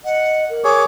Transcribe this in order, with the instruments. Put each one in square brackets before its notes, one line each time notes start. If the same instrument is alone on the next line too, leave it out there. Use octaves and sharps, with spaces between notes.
[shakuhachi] D#5 [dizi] F#5
[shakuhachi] A#4
[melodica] G#4 C#5 [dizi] D6